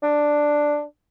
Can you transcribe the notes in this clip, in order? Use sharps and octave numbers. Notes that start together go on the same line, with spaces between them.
D4